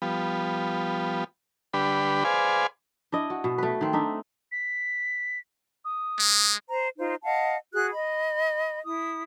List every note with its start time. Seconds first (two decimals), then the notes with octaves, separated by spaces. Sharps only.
0.02 F3 G3 B3
1.73 D3 G3 D4 G4 B4 B5
2.25 G#4 B4 C5 D5 F5 G#5
3.12 D4 E4 D#5
3.30 F#4
3.44 B2
3.58 A3 B4
3.81 D#3 C4
3.93 D4 D#4 E5
4.52 B6
5.85 D#6
6.19 G#3
6.68 C5 A#5
6.98 D#4 F4 C5
7.24 D#5 F5 F#5 A5
7.73 F#4 G#4 F#6
7.91 D#5 B5
8.85 E4 D#6